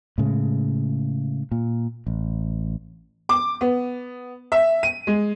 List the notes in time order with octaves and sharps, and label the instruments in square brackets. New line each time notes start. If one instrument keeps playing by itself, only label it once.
[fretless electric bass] A2 C#3 G#3
A#2
A1
[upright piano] D6
B3
E5
D#7
G#3